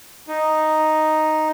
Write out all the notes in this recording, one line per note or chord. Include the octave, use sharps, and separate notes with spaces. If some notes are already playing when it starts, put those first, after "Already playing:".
D#4